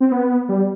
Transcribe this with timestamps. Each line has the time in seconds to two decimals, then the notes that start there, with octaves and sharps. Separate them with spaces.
0.01 C4
0.12 B3
0.49 G3